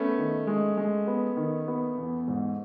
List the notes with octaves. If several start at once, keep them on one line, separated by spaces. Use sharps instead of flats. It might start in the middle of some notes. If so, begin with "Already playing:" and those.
Already playing: A3 B3 C#4
D#3
G#3
G#3
B3
D#3
B3
E2
G#2